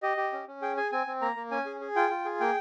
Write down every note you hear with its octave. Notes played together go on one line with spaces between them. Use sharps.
G4 D#5
G4
C#4
C#4
G#4 G5
G#4 G#5
C4 G#5
C4
A#3 A#5
A#3
C#4 G#5
G#4
G#4
F4 G5
F4
G#4
A#3 G5